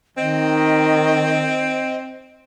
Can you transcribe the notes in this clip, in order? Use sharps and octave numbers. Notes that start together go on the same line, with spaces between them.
D#3 C4 D#5